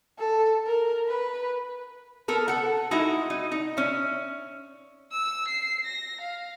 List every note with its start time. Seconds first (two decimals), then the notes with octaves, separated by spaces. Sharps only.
0.19 A4
0.66 A#4
1.08 B4
2.28 B3 A4 A#4
2.48 A4 F#5
2.91 G#3 D#4 E4 F#4
3.30 D#4
3.52 D#4
3.77 C#4 E5
5.11 E6
5.48 C7
5.85 A#6
6.21 F5